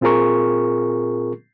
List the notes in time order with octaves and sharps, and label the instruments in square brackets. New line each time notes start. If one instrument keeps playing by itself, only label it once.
[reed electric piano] A#2 C4 F4 G#4 A#4 C#6